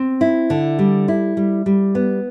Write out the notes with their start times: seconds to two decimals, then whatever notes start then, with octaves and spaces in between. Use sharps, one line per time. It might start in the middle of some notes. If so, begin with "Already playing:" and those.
Already playing: C4
0.21 E4
0.50 D3
0.79 G3
1.08 E4
1.37 G3
1.66 G3
1.95 B3